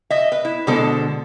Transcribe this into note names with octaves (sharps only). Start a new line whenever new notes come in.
D#5 E5
B4
E4
B2 D3 G#3 B3 A4 C5